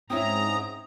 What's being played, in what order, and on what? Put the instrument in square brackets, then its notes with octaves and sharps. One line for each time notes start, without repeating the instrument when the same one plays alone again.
[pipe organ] G#2 A#5 [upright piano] C4 C#4 E4 [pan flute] D#6